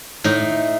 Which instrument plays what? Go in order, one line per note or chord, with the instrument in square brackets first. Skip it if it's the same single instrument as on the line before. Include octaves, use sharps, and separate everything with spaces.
[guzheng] A2 D#4